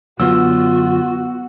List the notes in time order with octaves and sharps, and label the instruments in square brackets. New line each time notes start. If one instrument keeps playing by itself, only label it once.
[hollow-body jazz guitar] F#2 D3 F#3 [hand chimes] B3 E6 [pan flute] F4 [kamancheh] F#4